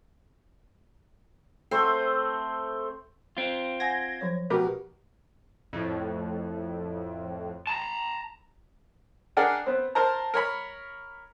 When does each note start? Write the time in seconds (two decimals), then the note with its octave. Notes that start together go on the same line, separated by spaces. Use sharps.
1.71 A3 C4 C5
3.37 C4 F4
3.80 F#5 G#5 G#6 A#6
4.21 F3 F#3 C#5
4.50 B2 G4 A#4 B4
5.73 F2 A2
7.67 A5 A#5
9.37 D4 G#4 A#4 D5 F#5 G5
9.66 B3 C4
9.95 A#4 C5 A5 A#5
10.34 A#4 C#5 B5